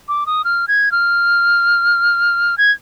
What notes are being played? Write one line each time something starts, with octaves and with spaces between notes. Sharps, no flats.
D6
D#6
F6
G#6
F6
G#6